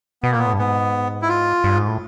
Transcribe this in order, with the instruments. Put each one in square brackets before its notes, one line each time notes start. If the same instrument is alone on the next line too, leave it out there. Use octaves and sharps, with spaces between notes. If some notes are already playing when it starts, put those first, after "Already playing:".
[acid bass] B2 [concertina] B3
[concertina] A#3
[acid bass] A#2 [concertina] B3
[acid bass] A2
G2
[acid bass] G#2 [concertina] B3
[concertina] E4
F4
[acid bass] G2
G#2
A2